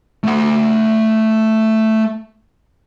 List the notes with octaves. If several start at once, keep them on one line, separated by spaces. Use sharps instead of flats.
A3 F#5